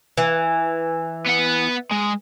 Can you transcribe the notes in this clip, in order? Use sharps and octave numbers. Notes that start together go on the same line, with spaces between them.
E3
B3 F#5
G#3